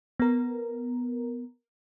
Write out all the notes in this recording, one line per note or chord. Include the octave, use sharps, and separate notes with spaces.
B3 A#4